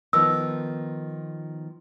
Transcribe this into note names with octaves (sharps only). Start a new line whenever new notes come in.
D#3 F3 B3 E6